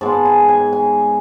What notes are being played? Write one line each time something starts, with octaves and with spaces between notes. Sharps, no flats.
G#2 G#3 B3 A5
G#5
G#5
G#5